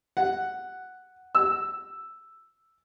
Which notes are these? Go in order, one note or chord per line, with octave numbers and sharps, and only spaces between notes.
F#5
E6